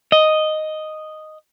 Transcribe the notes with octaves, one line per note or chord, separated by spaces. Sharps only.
D#5